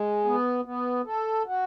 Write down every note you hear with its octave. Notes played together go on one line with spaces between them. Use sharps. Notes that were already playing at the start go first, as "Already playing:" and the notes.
Already playing: G#3
B3
B3
A4
F#4